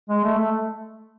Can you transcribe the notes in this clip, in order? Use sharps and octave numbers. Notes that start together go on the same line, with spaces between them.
G#3
A3
A3